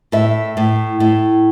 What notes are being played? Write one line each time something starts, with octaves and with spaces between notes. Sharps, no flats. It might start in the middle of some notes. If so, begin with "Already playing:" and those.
A2 E5
A2
A2